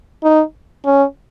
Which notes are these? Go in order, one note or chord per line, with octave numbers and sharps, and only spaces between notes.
D#4
C#4